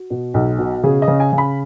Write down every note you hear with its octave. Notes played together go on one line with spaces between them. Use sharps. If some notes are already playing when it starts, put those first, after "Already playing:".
Already playing: F#4
B2
B1
B2
C#3 G#4
D#5
C#3
G#5
C#3
B5